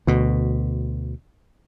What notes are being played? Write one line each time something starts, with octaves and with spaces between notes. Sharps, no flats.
D2 B2